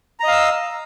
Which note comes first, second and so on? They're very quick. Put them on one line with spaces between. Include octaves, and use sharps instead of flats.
A#5 D#5 F5 E6